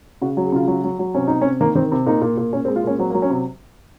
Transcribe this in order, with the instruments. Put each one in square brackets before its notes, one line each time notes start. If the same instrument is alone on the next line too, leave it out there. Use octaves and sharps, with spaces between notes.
[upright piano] C#3 F#4
F#3
G#4
C#3 F4
F#3
F#3
F#3
C3 C#4
C3 D#4
C#4
C3
D#3 A#3
D#3 C4
C3
A#2 D#4
A#2
A#2
A#2 C#4
C4
G#3
F4
A#2 C#4
F#3 C4
A#3
F#3
C#4
C3